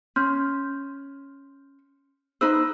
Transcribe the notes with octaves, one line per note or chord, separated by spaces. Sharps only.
C#4 C6 F6 G6
D#4 B4 C5 E6